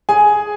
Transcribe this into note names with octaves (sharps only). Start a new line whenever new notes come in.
G#4 G#5